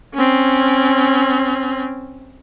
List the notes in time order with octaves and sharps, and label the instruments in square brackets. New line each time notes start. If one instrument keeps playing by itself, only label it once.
[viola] C4 C#4